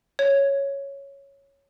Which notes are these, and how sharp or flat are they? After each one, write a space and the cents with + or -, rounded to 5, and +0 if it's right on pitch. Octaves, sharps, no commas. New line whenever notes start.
C#5 +0